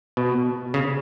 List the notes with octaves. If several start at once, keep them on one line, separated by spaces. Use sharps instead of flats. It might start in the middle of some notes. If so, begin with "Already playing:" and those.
B2
C#3